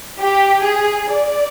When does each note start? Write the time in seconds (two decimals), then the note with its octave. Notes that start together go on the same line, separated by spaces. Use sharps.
0.18 G4
0.64 G#4
1.11 D5